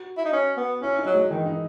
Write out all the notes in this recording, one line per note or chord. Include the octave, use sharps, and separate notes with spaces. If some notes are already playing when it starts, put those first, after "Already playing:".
Already playing: F#4
E4
D#4
C#4
B3
C#4 E4
D#4
F#3
G#3
D#3 E3
D#4